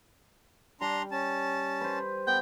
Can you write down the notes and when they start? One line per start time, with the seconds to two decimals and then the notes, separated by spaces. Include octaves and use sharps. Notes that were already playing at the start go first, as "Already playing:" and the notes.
0.81 G3 D4 A#5 C6
1.11 C#4 A5
1.81 B4 C5
2.27 B3 G5